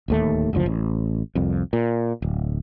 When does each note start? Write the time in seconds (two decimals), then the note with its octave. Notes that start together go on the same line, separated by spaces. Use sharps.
0.08 D1 D#2 A3
0.53 F#1 D2 F3
0.66 A1
1.35 C2 F2
1.73 A#2
2.22 D1